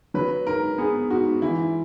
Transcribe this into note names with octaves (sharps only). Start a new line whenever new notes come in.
F#3 B4
G#2 A#4
B3 G#4
G#2 F#4
E3 E4